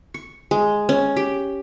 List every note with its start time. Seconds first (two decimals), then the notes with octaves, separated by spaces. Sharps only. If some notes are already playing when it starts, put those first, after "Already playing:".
0.14 C#6
0.51 G#3
0.89 C#4
1.17 G4